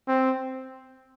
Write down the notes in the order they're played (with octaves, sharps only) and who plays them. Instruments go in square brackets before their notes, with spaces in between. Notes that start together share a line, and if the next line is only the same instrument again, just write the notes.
[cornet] C4